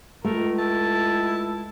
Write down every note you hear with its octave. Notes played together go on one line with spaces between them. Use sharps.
C#2 A3 A#4
E4 A5